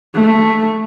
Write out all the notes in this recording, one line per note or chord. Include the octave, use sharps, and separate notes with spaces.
A3